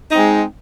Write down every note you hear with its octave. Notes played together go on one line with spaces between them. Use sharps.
G#3 C4 D#4